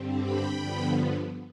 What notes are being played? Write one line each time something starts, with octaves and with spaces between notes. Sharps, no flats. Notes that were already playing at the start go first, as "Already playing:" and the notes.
Already playing: G2 D3 G3 C4
G5 B5
G2 D3 F3 B3